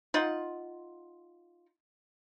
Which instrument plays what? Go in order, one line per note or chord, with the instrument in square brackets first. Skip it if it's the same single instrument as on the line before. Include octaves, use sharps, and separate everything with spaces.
[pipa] D#4 F4 F#5